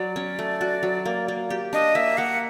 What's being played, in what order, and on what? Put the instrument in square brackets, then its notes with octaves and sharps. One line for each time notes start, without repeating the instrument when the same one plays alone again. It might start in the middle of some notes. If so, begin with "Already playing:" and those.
Already playing: [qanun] F#3 [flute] D5
[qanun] C#4
A3
F#4
F#3
A#3
A#3
G4
[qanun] D4 [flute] D#5
[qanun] A#3 [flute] E5
[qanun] A#3 [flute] F#5